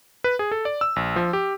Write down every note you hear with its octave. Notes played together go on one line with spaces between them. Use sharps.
B4
G#4
A4
D5
E6
A#1
F3
G4